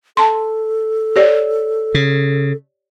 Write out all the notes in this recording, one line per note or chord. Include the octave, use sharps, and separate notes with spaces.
A4 A5 C6
G4 C#5 D5
C#3